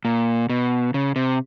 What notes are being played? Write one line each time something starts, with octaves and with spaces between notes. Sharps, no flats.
A#2
B2
C#3
C3